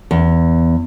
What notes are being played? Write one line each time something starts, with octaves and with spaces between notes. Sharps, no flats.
E2